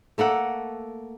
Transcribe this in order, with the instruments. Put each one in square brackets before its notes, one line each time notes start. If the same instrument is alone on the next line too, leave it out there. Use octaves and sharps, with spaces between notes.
[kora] A3 A#3 A4 F#5